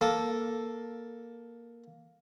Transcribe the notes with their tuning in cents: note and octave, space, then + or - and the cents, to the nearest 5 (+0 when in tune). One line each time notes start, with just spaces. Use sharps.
A#3 +10 A4 +0